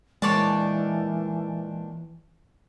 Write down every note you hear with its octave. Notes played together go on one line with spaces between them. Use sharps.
A#2 D#3 E3 G#3 D4 C#5 D5 A5